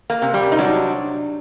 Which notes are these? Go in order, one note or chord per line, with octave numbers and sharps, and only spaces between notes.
A#3
C3
G3
D#4
F#3 D4